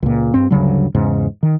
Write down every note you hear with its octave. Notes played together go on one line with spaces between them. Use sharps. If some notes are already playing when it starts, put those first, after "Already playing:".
C#2 A#2
G2 C4
D2 G2 C#3 F#3
E2 G#2 C#3
D#3